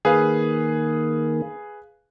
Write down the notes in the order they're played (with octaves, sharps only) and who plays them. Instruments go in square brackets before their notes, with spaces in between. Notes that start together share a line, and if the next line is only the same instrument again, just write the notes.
[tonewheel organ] D#3 A#3 [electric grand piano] G#4 B4 F5